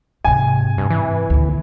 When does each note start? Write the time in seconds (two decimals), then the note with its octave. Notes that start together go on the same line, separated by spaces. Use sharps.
0.25 G#2 C3 G#5
0.78 G2
0.90 E3
1.30 D2 A#2